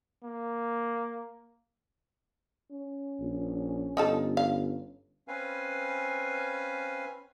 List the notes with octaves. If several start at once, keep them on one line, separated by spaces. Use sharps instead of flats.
A#3
C#4
A#1
G1 D#4 F4 A4
F5
C4 C#4 B4 F5 G#5